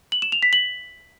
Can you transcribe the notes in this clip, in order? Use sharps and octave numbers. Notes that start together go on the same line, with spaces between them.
F#7
E7
F7
B6
F#7